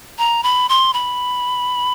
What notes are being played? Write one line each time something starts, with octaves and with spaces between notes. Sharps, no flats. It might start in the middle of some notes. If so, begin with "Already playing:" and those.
A#5
B5
C6
B5